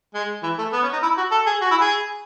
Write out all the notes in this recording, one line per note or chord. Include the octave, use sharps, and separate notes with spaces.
G#3
E3
A3
B3
C#4
D#4
E4
F#4
A4
G#4
F#4
E4
G#4